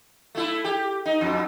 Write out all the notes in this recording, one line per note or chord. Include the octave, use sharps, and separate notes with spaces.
A3 E4
G4
D#4
F2